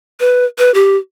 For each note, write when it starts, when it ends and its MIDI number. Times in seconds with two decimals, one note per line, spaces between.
0.20 0.45 71
0.58 0.73 71
0.74 0.97 67